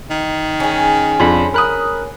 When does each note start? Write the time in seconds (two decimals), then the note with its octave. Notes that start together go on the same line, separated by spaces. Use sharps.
0.10 D#3
0.60 C#4 G#4
1.20 F2 D4 B5 C6
1.54 A#4 B5 D#6 F#6